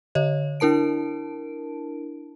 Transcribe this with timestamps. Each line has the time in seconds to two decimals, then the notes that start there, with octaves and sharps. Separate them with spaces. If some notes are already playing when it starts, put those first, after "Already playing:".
0.15 D3 C#5 D#5
0.60 D4 E4 A#4 A5 D7